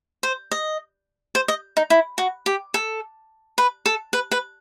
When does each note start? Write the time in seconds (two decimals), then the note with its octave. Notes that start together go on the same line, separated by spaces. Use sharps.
0.23 C5
0.52 D#5
1.35 C5
1.48 D#5
1.77 D#4
1.90 E4
2.18 F#4
2.46 G4
2.74 A4
3.58 B4
3.86 A4
4.13 B4
4.31 B4